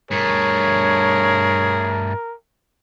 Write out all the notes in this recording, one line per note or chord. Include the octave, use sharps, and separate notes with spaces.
G2 A3 G#4 A#4 C#5